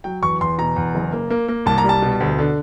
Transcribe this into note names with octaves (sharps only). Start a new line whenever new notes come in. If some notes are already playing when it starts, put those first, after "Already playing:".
F#3 G5
E2 C#6
E2 C6
B2 A#5
E2
F#1
A#3
A#3
A#3
C2 A5
A#5
G3 A5
B2
D2
D3